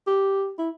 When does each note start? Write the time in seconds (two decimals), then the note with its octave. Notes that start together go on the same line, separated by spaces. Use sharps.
0.07 G4
0.59 E4